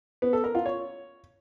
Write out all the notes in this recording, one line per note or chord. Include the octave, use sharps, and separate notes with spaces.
B3
A4
A#4
F4
C#5